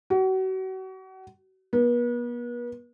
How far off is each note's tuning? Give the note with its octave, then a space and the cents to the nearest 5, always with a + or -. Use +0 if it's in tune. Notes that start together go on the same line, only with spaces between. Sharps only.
F#4 +35
B3 -40